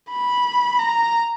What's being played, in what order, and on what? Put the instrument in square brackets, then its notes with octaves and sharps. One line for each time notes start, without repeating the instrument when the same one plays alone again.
[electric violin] B5
A#5